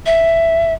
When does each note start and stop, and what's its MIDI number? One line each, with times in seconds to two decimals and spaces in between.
0.06 0.73 76